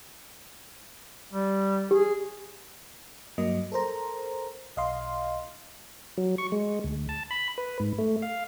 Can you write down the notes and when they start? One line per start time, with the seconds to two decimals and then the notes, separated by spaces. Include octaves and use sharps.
1.32 G3
1.91 G4 G#4
3.38 G2 F#3 A#3 D#5
3.72 A4 A#4 C5 A#5
4.76 B1 D#5 F5 C6
6.17 F#3
6.38 C#6
6.52 G#3
6.84 D2
7.09 A5
7.31 B5
7.58 B4
7.80 G#2
7.98 A3
8.22 F5